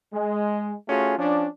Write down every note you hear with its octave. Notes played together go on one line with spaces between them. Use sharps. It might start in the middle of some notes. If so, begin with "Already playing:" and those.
G#3
A3 C#4 F4 F#4 G#4
F3 C#4 D4